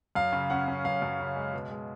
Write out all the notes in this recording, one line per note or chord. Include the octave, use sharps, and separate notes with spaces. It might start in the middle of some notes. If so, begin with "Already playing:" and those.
F#2 F5
C#3
C#4 F#5
C#4
F#2 F5
F#2
C#3
G#3
B2
G#3